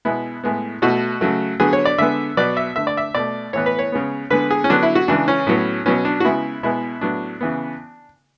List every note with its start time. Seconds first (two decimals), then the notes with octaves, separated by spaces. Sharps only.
0.05 B2 G#3 B3 E4
0.44 A2 G#3 B3
0.82 B2 A3 F#4
1.21 C#3 F#3 A3
1.60 D3 F#3 B3 G#4
1.73 C#5
1.85 D5
1.98 D3 G#3 B3 E5
2.37 B2 F#3 B3 D5
2.57 E5
2.76 D3 A3 E5
2.87 D5
2.97 E5
3.15 B2 A3 D5
3.53 A2 E3 B3 C#5
3.66 B4
3.79 C#5
3.92 C#3 G#3 B3
4.30 D3 G#3 B3 B4
4.51 G#4
4.64 C#4
4.69 D3 F#3 B3 D4
4.83 E4
4.95 F#4
5.08 C#3 E3 G#3 D4
5.28 C#4
5.47 A2 F#3 B3
5.86 B2 F#3 B3 C#4
6.05 D4
6.20 F#4
6.25 C#3 G#3 B3 E4
6.63 B2 G#3 B3 E4
7.01 A2 F#3 B3 D4
7.41 C#3 E3 B3